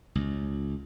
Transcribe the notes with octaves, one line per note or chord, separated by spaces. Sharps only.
C#2